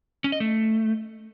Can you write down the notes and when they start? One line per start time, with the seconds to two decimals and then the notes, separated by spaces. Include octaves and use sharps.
0.24 C#4
0.32 D#5
0.40 A3